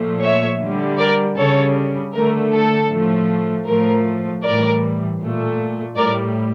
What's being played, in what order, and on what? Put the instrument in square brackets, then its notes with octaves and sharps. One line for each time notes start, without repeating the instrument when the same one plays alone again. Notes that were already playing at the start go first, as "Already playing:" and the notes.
Already playing: [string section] A#2 F3 A3
C#5 E5
D3 G3
A#4 D5
C#3 G3 A4 C#5
D3 A3 A#4
A4
A2 F3 A3
A2 F3 A3 A#4
A2 E3 G3 A#4 D5
A#2 A3
A2 G3 A#4 D5